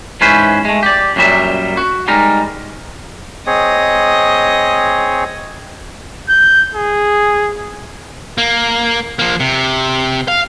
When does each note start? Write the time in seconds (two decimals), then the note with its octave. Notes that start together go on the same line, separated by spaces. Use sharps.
0.21 G#2 E3 C#4 B4 C5
0.65 G#3 A3
0.83 G4 D5
1.16 F#2 A#2 F#3 G3 E5
1.77 F#4
2.08 G3 G#3 D#4 A#4
3.47 C4 G#4 C#5 D#5
6.29 G6
6.75 G#4
8.38 A#3
9.19 F3 A#3
9.40 C3
10.28 F5